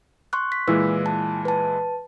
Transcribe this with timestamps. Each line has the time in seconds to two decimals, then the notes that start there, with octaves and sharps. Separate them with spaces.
0.33 C6 C#6 F#6
0.52 B6
0.68 A#2 E3 G#3 E4 B4 E6
1.06 A5
1.45 B4 A5